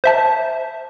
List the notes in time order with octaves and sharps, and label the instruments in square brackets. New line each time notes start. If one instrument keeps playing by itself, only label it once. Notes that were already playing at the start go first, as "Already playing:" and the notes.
[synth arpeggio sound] C5 E5 A5